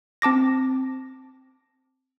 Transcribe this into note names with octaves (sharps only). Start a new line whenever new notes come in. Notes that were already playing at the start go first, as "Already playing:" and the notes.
C4 A5 D6 A#6